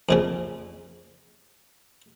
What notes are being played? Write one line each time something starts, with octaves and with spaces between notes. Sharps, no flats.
F2 A#2 C#3